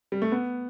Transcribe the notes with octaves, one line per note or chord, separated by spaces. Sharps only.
G3
A3
B3